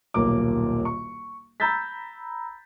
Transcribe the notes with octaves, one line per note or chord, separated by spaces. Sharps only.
D#1 B1 A#3 D6
C#6
A#5 B5 E6 G6 A6 B6